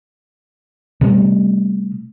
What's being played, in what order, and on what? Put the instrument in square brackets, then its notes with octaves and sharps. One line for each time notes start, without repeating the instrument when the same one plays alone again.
[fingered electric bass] C3 G3 A3 B3